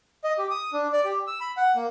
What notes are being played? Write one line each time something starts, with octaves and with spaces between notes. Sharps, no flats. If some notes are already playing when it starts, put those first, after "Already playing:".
D#5
G4
D#6
D4
D5
G4
E6
B5
F#5
A#3